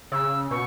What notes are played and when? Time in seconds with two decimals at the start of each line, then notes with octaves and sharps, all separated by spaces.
0.12 C#3 E6
0.51 B2 C#6